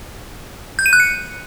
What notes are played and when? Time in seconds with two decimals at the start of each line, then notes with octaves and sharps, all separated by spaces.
0.79 G6
0.86 D#7
0.93 F#6
1.00 C#7